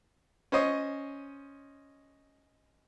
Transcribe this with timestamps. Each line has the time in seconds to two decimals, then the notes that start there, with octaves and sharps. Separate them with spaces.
0.52 C#4 C5 D#5 C#6